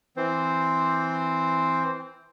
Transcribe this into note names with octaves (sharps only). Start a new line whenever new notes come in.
E3 C4 C5